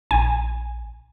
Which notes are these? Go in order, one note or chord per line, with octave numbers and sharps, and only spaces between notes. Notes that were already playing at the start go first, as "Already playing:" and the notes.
A#1 G#5